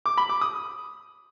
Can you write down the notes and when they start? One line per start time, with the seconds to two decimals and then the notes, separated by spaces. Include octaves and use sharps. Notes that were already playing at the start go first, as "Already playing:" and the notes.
0.06 D6
0.17 B5
0.29 D6
0.41 D#6